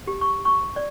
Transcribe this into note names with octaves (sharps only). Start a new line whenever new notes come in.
G4
C#6
C#6
D5